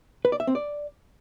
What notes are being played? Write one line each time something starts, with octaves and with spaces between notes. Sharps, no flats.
B4
D5
E5
C4
D5